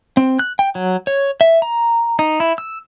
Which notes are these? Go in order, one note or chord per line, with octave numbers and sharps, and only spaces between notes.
C4
F#6
G5
F#3
C#5
E5
A#5
D#4
E4
E6